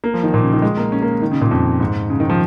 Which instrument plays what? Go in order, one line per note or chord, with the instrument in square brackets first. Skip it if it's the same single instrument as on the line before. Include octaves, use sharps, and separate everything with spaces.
[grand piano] A#3
F3
D#3
A#2
C#3
D#3
G#3
A#3
C#4
A#3
D#3
C#3
A#2
F2
G#2
C#3
D#3
F3